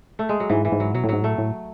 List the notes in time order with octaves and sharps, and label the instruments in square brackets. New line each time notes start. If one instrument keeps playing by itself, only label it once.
[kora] A3
G#3
F#3
[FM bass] G#2 [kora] E3
[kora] E3
[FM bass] G#2
[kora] F#3
[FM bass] B2 [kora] F#3
[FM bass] A2
[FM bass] G#2 [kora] F#3
[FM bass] A2 [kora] A3
[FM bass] A2